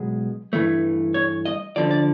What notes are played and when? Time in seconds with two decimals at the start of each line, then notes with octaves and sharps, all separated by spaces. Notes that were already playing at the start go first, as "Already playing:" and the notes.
Already playing: B1 B2 G#3
0.53 G2 E3 A3
1.14 C#5
1.45 D#5
1.76 D2 D3 F3 D5
1.91 D5